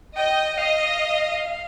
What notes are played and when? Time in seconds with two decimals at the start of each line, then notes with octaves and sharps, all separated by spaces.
0.16 D#5 G5
0.58 D#5 F5